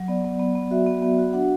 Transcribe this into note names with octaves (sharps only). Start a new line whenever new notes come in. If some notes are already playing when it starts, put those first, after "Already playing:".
Already playing: F#3
B3 D5
B3
B3
B3
F#4 E5
B3
B3
F#4
D4 F#5